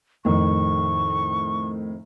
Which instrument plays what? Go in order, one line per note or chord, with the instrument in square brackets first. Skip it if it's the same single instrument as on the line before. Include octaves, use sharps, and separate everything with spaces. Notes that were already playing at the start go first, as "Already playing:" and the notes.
[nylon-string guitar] F2 [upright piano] A2 D#3 [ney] C#6